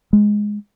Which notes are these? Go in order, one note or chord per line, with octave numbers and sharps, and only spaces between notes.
G#3